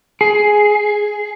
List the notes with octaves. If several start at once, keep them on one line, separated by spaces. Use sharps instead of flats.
G#4